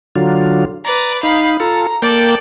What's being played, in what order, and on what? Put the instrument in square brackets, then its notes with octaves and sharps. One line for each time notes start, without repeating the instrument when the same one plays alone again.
[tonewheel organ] D3 F#3 F4
[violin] B4 D5 [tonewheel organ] A#5
[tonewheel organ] D#4 [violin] F5 B5
[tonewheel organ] F4 A4 [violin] A#5
[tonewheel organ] A#3 G5 [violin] A4 D5